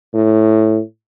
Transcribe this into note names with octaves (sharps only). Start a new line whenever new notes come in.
A2